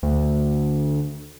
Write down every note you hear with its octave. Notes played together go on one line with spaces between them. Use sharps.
D2